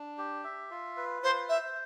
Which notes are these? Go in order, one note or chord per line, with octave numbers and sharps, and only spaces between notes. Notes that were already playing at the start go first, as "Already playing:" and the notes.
Already playing: D4
G4
E5
F4
B4
F4 C5
C5 E5